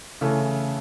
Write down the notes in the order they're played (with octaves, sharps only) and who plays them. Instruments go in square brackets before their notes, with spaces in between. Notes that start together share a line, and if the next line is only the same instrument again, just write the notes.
[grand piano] C#3 E3 A3